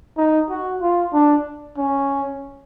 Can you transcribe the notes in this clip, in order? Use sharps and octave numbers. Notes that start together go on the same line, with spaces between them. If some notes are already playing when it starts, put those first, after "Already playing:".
D#4
F#4
F4
D4
C#4